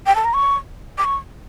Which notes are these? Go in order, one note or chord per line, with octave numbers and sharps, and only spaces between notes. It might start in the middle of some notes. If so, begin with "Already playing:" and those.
G5
A5
A#5
C#6
D6
C#6